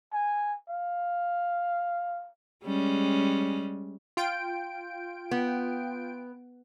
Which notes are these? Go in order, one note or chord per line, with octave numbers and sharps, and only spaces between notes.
G#5
F5
G3 G#3 C#4
F4 G5 D7
B3